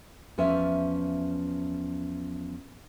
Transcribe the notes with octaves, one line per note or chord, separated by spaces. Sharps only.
E2 F3 C#4 E5